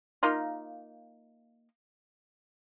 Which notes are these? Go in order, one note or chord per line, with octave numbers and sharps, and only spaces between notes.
A#3 D#4 F4